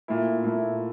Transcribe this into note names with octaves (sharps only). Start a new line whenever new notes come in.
A#2 A3 E4
A#2 A3 E4